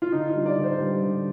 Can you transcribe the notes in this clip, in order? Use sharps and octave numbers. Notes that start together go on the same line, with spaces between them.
F4
D3 D#4
F4
G3
D5
D3
C5
G3
D3